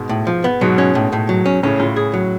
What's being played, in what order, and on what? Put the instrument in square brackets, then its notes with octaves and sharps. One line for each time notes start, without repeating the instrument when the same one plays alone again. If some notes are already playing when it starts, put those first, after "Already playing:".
Already playing: [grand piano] G#2 B2
[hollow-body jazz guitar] A2
F3
B3
[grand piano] G#2 B2 [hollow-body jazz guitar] F#3
[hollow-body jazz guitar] C#4
A2
A2
F#3
C#4
[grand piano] A2 C#3 [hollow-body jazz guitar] C#4
[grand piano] A2 C#3 [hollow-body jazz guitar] F4
[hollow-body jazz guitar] G#4
F#3